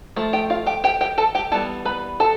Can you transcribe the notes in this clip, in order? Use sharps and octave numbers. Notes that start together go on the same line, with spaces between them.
F3 A3
G4 G5
F4 F5
G4 G5
G4 G5
G4 G5
A4 A5
G4 G5
E3 G3 B3 A4 A5
B4 B5
A4 A5